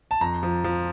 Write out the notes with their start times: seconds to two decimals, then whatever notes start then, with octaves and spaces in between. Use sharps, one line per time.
0.11 A5
0.21 F2 A#5
0.43 F3
0.64 F3